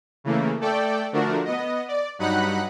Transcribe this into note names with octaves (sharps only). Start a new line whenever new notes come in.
C#3 E3 A3 A#3
A3 A4 D5 G5
D3 F3 A3 D4 F#4 A#4
B3 D#5
D5
G2 F#3 D#4 F#5 B5 F#6